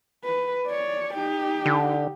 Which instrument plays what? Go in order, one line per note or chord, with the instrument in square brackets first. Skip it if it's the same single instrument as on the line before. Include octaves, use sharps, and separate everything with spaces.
[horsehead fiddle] B4
C#5 D5
D#4 G4
[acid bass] D3